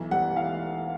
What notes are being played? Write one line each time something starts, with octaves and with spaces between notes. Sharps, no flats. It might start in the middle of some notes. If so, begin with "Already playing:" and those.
Already playing: B1 E3
G3 F#5
E3 F5